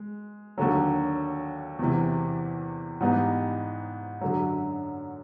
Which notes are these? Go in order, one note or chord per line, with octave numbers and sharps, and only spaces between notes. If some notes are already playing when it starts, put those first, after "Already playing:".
Already playing: G#3
D#2 D3 F#3
E2 C3 E3
G#2 E3 G3 B3 D#4
F#2 D3 F#3